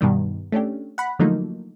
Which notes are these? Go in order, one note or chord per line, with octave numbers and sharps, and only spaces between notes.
G2 B2 D#3 G3
A3 C#4 D4 G4
F#5 B5
D3 F3 F#3 A3 A#3 D#4